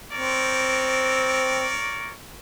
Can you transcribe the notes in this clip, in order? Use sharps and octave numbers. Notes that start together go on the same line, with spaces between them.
C4 A#4 C#5 D5